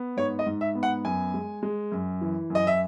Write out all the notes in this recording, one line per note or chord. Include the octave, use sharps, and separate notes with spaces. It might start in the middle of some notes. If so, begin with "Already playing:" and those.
Already playing: B3
G#2 C#5
D#5
G#2
E5
B3
F#5
F#2 G#5
G#3
G#3
F#2
E3
F#2
D#5
E5